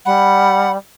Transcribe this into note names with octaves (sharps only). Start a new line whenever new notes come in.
G3 F#5 B5